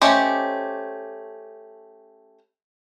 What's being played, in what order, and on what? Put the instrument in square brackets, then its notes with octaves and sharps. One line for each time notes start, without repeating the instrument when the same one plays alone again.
[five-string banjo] A3 C#4 G4 C5 D#5